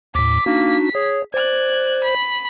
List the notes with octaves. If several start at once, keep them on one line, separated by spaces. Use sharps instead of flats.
D#2 A2 D6 B6
A#3 D4 D#4 F#4
G#4 C#5
C5 D5 F#6 G#6
B5